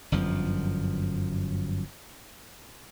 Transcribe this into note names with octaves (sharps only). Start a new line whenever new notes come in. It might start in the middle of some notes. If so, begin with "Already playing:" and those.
G1 F#2 F3